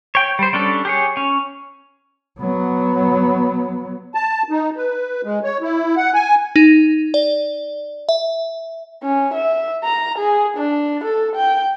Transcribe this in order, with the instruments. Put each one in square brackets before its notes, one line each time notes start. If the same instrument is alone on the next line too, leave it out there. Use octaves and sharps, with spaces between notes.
[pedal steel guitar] C#5 G5
G3 C5
G3 C#4 D4 A4
G4 G#4 C#5
C#4
[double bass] F#3 B3
[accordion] A5
D#4
B4
G#3
C#5
E4
F#5
G#5
[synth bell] D#4
D5
E5
[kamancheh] C#4
E5
A#5
G#4
D4
A4
G5